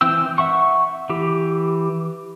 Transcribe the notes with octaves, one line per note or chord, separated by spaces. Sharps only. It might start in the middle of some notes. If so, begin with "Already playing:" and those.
E3 C4 G5 E6
E5 F#5 C#6
E3 G4